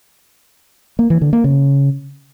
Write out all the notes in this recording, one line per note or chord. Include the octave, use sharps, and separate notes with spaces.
A#3
E3
D3
A#3
C#3